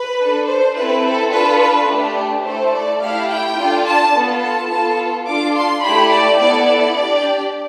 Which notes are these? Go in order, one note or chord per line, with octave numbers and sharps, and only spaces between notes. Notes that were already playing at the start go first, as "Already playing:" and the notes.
Already playing: B4
D4 A4
C5
C4 E4 A4 B4
A4
D4 F4 A4 B4
B4
A3 D4 G4
A3 E4 A4 C5
D5
A3 E4 G4 F5
G5
D4 F4 A4
A5
B3 F4 A4
A5
B3 F4 A4 A5
D4 F4 A4 D6
C6
A3 E4 G4 B5
D5
B3 E4 A4 D5
D5
D4 G4